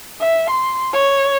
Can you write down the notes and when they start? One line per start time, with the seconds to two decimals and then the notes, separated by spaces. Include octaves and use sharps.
0.20 E5
0.50 C6
0.93 C#5